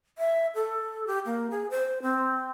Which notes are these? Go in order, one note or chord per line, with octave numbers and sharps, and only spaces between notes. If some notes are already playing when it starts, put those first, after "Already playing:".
E5
A4
G4
A#3
G#4
C5
C4